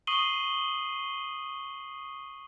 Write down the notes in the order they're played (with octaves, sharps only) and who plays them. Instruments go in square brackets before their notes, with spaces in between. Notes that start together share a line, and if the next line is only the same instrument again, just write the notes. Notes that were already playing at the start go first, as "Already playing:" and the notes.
[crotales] C#6 D#6 C7 D#7 F#7 G7